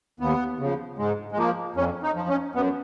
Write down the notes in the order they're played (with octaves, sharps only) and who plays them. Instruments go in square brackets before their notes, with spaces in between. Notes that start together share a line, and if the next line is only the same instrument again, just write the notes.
[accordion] D#2 B3
C#3 F3
G#2 G#3
G#3
F3 A#3
F2 C#4
D#4
F3
C#4
F#2 B3